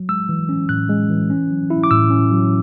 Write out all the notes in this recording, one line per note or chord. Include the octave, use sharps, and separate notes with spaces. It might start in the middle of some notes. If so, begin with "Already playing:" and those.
Already playing: F#3
G#3 E6
E3
C#4
A2 F#6
G#3
E3
C#4
F#3
E4
D6
A2 E6
C#4
F#3